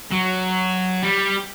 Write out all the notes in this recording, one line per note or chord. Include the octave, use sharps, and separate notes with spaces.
F#3
G3